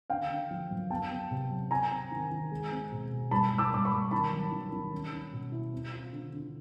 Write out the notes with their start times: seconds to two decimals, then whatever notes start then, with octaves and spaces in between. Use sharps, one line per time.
0.10 D3 F5 G5
0.30 D3
0.51 F3
0.71 F#2
0.90 B3 G5 A5
1.11 B3
1.31 C3
1.51 F#3
1.70 C4 G#5 A#5
1.91 C4
2.12 D#3
2.32 D#3
2.52 G#3
2.72 C4
2.92 B2
3.12 B2
3.31 G2 A5 B5
3.51 G2
3.58 D6 E6
3.72 G2 D6
3.85 B5 C#6
3.92 G2
4.11 D#3 A5 B5
4.33 F#3
4.52 D#3
4.72 D#3
4.93 C#4
5.13 C#4
5.33 B2
5.52 E4
5.73 C4
5.92 F4
6.13 D3
6.33 D3